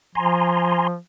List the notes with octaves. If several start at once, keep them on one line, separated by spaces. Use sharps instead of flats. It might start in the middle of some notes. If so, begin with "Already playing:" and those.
F3 G#5 A#5 C6